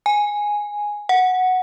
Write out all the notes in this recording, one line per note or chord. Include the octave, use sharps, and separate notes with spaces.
G#5
F#5